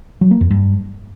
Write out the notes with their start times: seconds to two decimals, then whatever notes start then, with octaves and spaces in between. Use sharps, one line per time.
0.21 F#3
0.31 A#3
0.41 F2
0.50 G2